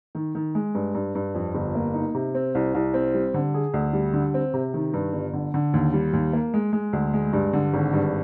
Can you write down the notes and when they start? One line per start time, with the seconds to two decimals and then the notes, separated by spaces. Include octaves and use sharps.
0.15 D#3
0.35 D#3
0.55 G#3
0.75 G2
0.95 G2
1.15 G2
1.35 F2
1.55 G1
1.75 A#3
1.94 D#4
2.15 C3
2.35 C4
2.55 C2
2.75 C2
2.94 C4
3.14 G3
3.34 D3
3.54 G#4
3.74 D2
3.93 G3
4.14 D3
4.34 C4
4.54 C3
4.74 D#3
4.94 G2
5.13 G1
5.33 D3
5.54 D3
5.74 D#2
5.94 G3
6.13 D#2
6.33 A#3
6.54 G#3
6.73 G#3
6.93 D2
7.13 G#3
7.33 G2
7.53 D3
7.74 G#1
7.93 G2